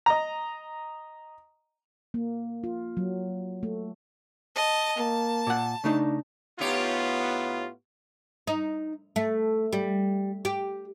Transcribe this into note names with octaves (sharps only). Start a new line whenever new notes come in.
D#5 A#5
A#3
F4
F#3
A3
D#5 A5
A#3 A5
A#2 F#5
C#3 A3 D4 D#4
A2 B3 D#4 F4 G4 C#5
D#4
A3
G3
G4